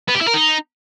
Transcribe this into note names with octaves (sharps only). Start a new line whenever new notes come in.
B3
G4
E4
A#4
D#4